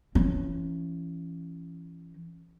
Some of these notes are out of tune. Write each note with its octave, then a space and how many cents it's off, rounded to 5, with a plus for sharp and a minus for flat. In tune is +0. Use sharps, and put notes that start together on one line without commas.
E3 +30 C#4 -5